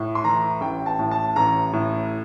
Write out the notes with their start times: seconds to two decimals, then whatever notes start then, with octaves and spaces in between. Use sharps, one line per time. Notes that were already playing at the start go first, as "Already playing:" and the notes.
Already playing: A2
0.15 C6
0.24 E3 A#5
0.61 A1 G5
0.86 A5
0.99 A2
1.11 A5
1.36 A1 A#5
1.73 A2